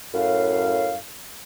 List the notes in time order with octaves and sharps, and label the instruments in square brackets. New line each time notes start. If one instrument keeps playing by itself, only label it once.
[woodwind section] F#2 A2 F5